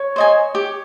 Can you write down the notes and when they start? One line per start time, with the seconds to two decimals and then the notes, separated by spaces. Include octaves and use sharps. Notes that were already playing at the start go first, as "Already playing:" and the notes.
Already playing: C#5
0.16 C5 D#5 G#5
0.55 G4